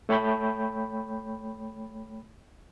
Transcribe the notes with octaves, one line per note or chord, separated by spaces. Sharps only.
A3 C#5 G5 B5 G6